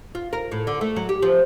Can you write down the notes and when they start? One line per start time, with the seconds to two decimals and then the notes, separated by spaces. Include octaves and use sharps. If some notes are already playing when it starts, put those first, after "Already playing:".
0.15 F4
0.33 A#4
0.52 A2
0.67 D3
0.81 A3
0.96 F#3
1.09 G4
1.22 F3